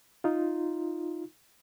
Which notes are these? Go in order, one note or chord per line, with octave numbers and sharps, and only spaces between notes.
D#4 F4